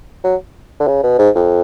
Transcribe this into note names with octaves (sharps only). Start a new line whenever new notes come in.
F#3
D3
C#3
B2
G#2
F2